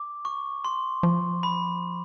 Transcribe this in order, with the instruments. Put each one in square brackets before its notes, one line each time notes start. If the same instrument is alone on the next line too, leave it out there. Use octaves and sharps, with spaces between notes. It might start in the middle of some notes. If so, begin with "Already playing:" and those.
Already playing: [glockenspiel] D6
C#6
C6
[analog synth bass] F3
[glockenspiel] B5